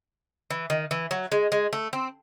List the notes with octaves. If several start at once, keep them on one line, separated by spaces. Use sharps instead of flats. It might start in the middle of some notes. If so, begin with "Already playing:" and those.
E3
D#3
E3
F#3
G#3
G#3
A3
C4